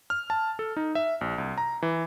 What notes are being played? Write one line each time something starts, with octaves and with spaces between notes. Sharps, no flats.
F6
A5
A4
D#4
E5
A#1
C2
A#5
E3